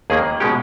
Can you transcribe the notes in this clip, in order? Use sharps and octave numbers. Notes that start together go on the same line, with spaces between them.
D#2 D#3 A#3 G#4
B2 G#3 C#4 G4